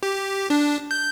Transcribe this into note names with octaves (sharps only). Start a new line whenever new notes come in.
G4
D4
G6